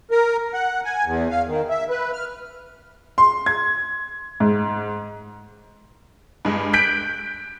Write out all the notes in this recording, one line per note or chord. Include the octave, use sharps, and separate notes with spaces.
A#4
F#5
G#5
E2
F5
D#3
E5
B4
F6
C6
G#6
G#2
G2 G#3
F#6 G6 B6 D7